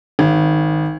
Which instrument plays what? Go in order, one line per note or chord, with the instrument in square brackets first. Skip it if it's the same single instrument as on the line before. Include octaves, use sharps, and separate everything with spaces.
[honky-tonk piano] G#1